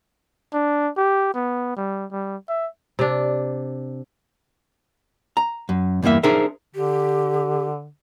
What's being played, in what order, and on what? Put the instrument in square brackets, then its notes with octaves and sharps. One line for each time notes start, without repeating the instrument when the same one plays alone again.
[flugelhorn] D4
G4
B3
G3
G3
E5
[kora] C3 D4
[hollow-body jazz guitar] A#5
F#2
E2 G2 E3 A#3 E5
D4 D#4 G#4 A#4 C5 E5
[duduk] D3 [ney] G4